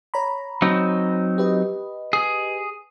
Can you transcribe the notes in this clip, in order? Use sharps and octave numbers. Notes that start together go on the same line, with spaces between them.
C#5 A#5 B5
F#3 C4 D#4
G4 B4 D#5
G#4